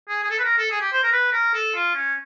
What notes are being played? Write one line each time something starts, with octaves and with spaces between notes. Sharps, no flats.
G#4
G#4
A4
B4
A#4
A4
G#4
G4
C5
A#4
B4
A#4
A4
F4
C#4